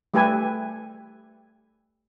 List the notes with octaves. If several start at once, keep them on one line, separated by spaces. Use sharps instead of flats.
G3 A3 G4 A4 B4 G#5